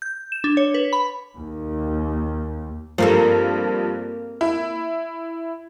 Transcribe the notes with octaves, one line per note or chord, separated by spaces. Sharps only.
G6
E7
D4
C#5
B4
B5
D#2
G2 F3 A#3 C4 A4
E4